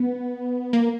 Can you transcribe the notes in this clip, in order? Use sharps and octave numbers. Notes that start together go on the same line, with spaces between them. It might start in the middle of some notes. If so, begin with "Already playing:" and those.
Already playing: B3
A#3